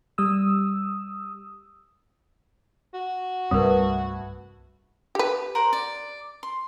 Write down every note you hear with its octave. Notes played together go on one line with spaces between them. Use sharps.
G3 D#6 E6
F#4
C2 G2 G3 A3 C4 E4 A#4 B4
G4 B4
A#4 C5 F#5
D5
C6